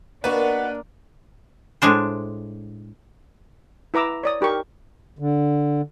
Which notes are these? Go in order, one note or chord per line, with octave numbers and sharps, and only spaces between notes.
A#3 B3 D4 D#4 F#4 B4
A2 G#3 D4 C5
E4 B4 A#5 D6 E6
C#5 D5 D#6
D#4 G4 A#4 C#6
D3